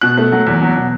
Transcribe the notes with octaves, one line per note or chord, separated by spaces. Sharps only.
B2 F#6
A3
F#3
E2
F#3
B2